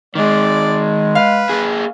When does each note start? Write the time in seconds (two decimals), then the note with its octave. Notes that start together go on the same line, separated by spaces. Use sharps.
0.15 D#3 G#3 G#4 D5
1.15 B4 F5
1.50 A#3 G#4